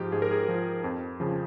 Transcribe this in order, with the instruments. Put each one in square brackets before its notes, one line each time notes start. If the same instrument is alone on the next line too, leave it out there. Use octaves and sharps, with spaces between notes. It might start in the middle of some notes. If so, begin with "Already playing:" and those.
Already playing: [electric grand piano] G#2 F3 G4
G#2 G#4
A#4
G#4
F3
F2
C#3 F3